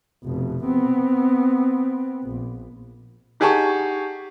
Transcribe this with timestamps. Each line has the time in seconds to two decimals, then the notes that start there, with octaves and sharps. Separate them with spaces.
0.24 F1 B2
0.64 B3 C4
2.23 A#1
3.40 D#4 G4 G#4 F#5 A5 C#6